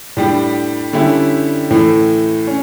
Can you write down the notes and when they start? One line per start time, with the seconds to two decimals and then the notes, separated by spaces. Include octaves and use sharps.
0.17 A2 G3 D4
0.93 D3 G3 C#4 E4
1.71 A2 E3 A3
2.47 C#4